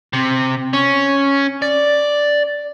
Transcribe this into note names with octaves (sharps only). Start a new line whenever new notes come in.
C3
C#4
D5